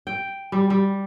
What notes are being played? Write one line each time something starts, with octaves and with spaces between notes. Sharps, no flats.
G5
G3
G3